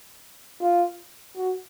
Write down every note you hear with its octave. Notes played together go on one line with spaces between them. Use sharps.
F4
F#4